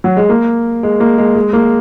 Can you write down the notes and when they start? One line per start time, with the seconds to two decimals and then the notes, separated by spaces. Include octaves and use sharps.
0.04 F#3
0.17 G#3
0.29 A#3
0.83 G#3
1.00 A#3
1.18 G#3
1.36 G#3
1.53 A#3